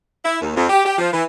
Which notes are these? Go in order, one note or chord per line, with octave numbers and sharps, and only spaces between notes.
E4
D#2
F2
G4
G4
F3
E3